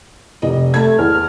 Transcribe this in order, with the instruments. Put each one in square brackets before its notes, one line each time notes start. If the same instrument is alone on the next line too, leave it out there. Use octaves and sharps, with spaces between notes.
[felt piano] F1 D#5
[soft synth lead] A3 [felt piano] A5 G#6
[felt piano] E2 [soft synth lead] F6